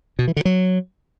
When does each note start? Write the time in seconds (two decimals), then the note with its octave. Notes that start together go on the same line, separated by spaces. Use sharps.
0.19 B2
0.28 E3
0.37 D3
0.45 F#3